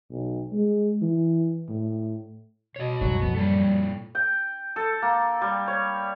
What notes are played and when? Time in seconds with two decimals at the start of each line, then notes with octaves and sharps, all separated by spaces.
0.11 B1
0.52 G#3
1.02 E3
1.69 A2
2.76 B2 C#5 D#5
3.01 C2 F#2 A2 G3 F#4 C#5
3.22 F3 B3
3.36 A#2 G3 A4
4.15 G5
4.76 A4
5.02 A#3
5.41 G3
5.68 C#5